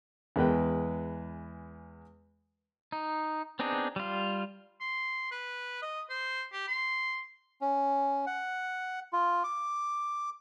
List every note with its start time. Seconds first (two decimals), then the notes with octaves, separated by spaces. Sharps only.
0.36 E2 G#3 B4 G5
2.92 D#4
3.59 B3 C4 D4 D#4 G#4
3.96 G3 F4
4.80 C6
5.31 B4
5.82 D#5
6.09 C5
6.52 G4
6.68 C6
7.61 C#4
8.27 F#5
9.13 F4
9.44 D6